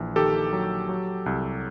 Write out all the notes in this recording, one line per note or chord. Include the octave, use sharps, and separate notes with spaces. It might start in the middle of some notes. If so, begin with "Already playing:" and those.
Already playing: A#1 E3
D#3 G4 A4
F#3
F#3
C2